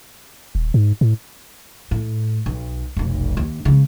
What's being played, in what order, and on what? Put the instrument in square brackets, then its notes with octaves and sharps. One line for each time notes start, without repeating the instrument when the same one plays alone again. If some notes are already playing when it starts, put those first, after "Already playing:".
[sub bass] D#1
G#2
A2
[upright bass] A2
B1
F1 B1
D#2
C#3 G#3